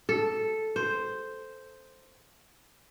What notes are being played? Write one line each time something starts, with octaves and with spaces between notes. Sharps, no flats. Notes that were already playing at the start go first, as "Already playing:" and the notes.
A4
C5